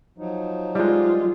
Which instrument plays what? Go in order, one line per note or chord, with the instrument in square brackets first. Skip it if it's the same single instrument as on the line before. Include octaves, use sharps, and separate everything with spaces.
[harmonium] F3 F#3 D#4
[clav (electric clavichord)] G3 G#3 [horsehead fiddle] F4